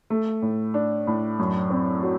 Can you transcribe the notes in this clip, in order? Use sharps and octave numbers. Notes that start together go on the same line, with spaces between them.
A3
A2
D4
A2
F#2
C4
F#3